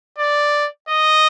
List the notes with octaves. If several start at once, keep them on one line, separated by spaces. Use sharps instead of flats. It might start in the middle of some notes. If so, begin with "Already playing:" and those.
D5
D#5